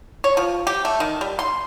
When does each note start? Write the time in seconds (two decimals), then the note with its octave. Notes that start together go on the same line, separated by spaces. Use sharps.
0.24 C#5
0.37 F3
0.67 G4
0.85 A3
1.00 D#3
1.21 G3
1.39 C6